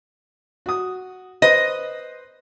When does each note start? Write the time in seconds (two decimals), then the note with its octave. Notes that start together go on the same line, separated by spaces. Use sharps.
0.66 F#4 D#6
1.42 B4 C5 D#5